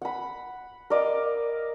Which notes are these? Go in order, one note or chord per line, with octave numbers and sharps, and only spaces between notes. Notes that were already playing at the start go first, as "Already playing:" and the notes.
F#5 B5
A#4 D5 D#5 F5